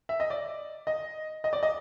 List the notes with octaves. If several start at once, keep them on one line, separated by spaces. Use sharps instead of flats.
E5
D#5
D5
D#5
D#5
D5
D#5